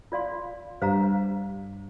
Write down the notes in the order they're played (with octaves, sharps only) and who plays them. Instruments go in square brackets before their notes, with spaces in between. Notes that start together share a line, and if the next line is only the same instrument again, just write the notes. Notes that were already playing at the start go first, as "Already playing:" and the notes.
[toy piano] F4 D5 F5 C6
[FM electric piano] G2 [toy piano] C5 F5 A#5